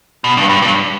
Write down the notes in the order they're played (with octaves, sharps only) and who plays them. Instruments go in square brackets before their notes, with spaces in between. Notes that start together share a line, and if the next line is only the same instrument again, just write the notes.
[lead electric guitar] B2
G2
G2
G2